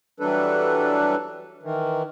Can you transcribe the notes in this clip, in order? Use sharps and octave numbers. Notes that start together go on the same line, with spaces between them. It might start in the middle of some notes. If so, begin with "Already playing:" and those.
E3 F#3 G3 D4 A4 B4
D#3 E3